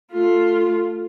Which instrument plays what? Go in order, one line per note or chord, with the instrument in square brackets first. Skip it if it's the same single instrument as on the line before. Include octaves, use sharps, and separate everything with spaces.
[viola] A3 F4